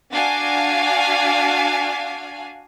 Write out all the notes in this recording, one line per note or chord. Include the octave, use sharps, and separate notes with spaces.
D4 F#4 F5 G#5